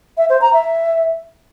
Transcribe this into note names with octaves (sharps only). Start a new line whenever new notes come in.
E5
C5
A#5
E5